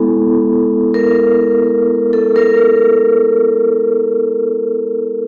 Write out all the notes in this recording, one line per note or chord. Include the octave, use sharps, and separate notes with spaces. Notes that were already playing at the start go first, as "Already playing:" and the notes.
Already playing: G#3 B3 E4 A4
A#4
A4
A#4